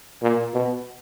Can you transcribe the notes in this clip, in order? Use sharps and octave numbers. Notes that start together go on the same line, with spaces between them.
A#2
B2